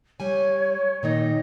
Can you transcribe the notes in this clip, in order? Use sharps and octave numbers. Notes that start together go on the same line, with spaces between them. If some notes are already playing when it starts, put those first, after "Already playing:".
G3 C#5 G#5
A#2 D#3 D#4 D#5